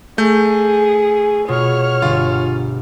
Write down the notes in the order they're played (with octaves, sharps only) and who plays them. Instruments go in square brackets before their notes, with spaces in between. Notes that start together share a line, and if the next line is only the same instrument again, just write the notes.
[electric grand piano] A3 G6 [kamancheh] G#4
[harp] B2 F4 G#4 [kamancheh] C#5 F6
[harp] G1 [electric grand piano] F4